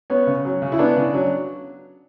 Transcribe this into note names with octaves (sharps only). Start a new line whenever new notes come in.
B3 C#4
C#3
F#3
C#3
E4
B3 D4
C#3
F#3